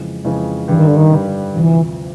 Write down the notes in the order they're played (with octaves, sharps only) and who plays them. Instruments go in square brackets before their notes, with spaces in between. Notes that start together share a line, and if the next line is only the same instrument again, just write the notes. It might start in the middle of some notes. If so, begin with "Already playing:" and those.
Already playing: [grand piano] F2 C#3 E3 G#3
F2 C#3 E3 G#3
[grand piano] G2 D3 G3 [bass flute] E3
[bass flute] D#3
D3
D#3
[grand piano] G2 D3 G3
[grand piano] D2 C3 F3 [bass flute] E3